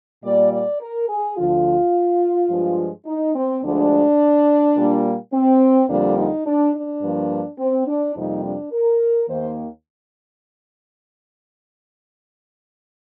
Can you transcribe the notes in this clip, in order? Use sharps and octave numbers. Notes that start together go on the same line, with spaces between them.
A#2 G3 A#3 D5
D5
A#4
G#4
D2 D3 F3 F4
G2 F3 G#3
D#4
C4
D2 D3 F3 G#3 D4
A#2 G3 A#3
C4
F2 D3 G3 A#3 D4
D#4
D4
D4
G2 F3 A#3
C4
D4
F2 C3 G3 A#3 D#4
D4
A#4
D#2 D#3 A#3 C5